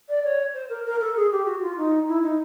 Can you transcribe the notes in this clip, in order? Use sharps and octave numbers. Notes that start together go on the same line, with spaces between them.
D5
C#5
C5
A#4
A#4
A4
G#4
G4
F#4
F4
D#4
E4
D#4